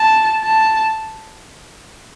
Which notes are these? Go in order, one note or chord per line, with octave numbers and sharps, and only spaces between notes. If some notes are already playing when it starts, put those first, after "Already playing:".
Already playing: A5
A5